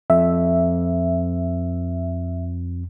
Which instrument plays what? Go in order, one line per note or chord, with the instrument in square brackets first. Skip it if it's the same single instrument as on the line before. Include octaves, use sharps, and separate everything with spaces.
[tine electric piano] F2 [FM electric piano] E5